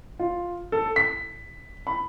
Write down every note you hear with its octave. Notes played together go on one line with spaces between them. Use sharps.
F4
A4
B6
B5